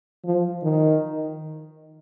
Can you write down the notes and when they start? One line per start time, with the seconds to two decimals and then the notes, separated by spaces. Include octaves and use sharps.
0.24 F3
0.63 D#3